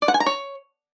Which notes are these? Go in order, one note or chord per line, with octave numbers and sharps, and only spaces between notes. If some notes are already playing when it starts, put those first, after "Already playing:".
D5
F#5
G#5
A#5
C#5